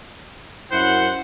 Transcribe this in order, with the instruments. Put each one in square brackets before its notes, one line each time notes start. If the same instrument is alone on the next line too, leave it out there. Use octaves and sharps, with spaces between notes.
[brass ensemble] F#2 E4 F#5 [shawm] C5